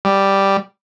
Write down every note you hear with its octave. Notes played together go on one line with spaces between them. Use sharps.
G3